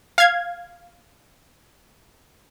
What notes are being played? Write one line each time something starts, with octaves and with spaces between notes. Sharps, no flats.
F5 G#6